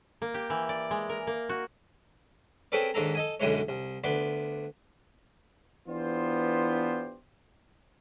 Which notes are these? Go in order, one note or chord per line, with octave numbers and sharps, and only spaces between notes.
A#3
G4
E3
D5
G#3
A#4
A#3
F#4
C4 C#4 G#4 A4 B4 D5
D#2 G#2 D4 A4 A#5
A4 D#5 G#5
B1 F#2 D3 E3 G#3 C#5
C2
D2 B3 D5 C6
E3 B3 D4 F4 G4 C5